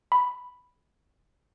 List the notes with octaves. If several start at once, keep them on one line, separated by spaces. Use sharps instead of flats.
B5